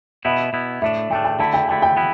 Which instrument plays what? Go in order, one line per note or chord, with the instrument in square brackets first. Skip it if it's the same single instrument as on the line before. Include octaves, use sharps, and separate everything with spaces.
[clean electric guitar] B2 B3 E4 [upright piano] E5
[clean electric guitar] B2 B3 E4
[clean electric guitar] A2 A3 D4 [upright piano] E5
[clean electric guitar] A2 A3 D4 [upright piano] G5
[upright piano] G5
[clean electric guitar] D3 A3 E4 [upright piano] A5
[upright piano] G5
[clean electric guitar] D3 A3 E4 [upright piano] G5
[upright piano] G5
[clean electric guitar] E3 B3 E4